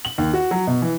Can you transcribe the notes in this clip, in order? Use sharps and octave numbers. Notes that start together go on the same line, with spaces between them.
F#7
D#2
F#4
F#3
B2
E3